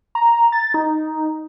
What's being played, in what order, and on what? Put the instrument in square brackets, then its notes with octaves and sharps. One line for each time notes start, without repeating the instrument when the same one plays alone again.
[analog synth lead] A#5
A6
D#4